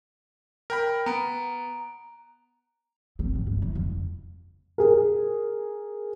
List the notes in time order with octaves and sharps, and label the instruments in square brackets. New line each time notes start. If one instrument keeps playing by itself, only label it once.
[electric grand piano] A#4 G5 B5
[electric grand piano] B3 [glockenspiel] A#5 D7
[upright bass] C4
G#2
G2
E4
F2
[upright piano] G#4 A#4